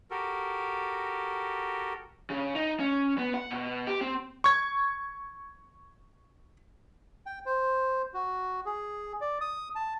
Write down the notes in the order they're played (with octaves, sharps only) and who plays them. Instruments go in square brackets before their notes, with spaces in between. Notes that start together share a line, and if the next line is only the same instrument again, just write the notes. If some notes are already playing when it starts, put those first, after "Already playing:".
[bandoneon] F#4 G4 A4 A#4
[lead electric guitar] C#3
D#4
C#4
B3
F#5
B2
G4
C4
[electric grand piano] C#6 G#6
[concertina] G5
C5
F#4
G#4
D5
D#6
A5